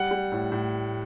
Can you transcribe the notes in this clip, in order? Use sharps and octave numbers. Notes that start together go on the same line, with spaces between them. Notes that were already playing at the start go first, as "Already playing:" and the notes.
Already playing: G3 F#5
G3
A2
A2